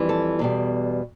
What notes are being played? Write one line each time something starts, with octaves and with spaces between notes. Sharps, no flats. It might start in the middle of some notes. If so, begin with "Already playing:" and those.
Already playing: F2 E3 G3
A4
E2 B2 G3